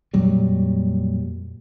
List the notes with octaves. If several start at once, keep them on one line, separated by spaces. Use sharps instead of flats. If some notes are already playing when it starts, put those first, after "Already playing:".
F2 A#2 F#3 G3